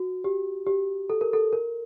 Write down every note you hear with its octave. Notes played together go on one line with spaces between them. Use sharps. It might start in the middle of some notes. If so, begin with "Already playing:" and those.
Already playing: F#4
G4
G4
A4
A#4
A4
A#4